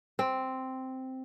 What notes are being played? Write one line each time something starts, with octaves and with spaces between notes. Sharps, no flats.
C4